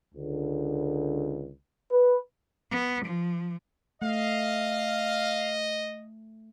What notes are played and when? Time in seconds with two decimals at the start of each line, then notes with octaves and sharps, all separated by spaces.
0.15 C#2 D3
1.91 B4
2.72 B3
3.05 F3
4.02 A3 D#5 F5